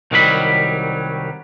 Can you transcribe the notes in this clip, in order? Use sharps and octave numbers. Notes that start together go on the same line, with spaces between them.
C2 D#3 F#3 G3 B5